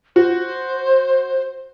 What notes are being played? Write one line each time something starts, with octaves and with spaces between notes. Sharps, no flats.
F#4 C5